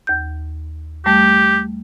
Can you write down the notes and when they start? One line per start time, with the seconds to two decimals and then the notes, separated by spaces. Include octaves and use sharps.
0.07 D#2 G6
1.06 G3 A3 G4